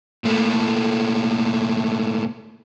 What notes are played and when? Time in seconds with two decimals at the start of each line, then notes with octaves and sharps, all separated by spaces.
0.24 A#2 A3